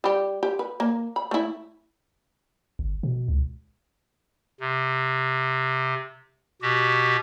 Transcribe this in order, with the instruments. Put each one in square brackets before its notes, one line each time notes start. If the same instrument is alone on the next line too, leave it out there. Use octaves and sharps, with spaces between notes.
[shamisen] G3 G4
G4
B4
A#3
B5
A3 E4
[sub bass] G1
B2
C#2
[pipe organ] C3
B2 F#4 G4